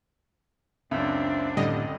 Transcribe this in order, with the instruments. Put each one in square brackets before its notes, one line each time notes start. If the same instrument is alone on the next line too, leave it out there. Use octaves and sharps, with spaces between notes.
[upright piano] C#2 F#2 [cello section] C4 D4 [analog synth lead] E5
[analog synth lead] A2 [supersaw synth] D3 G3 D#5